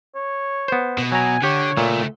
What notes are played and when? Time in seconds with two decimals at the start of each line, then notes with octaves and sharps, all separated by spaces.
0.15 C#5
0.68 B3 C5
0.98 B2
1.12 F#3 G#5 A#5
1.43 D3 G4 C#5
1.77 C#2 A#2 A3